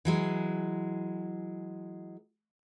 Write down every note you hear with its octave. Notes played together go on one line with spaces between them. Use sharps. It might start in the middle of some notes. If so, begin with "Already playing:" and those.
E3 F#3 G#3